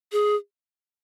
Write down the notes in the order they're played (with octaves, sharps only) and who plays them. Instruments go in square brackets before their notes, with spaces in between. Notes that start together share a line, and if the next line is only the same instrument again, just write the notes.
[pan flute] G#4